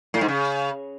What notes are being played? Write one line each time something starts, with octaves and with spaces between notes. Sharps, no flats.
A2
G#2
C#3